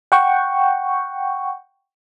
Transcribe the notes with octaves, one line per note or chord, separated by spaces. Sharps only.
F#5 G5 C#6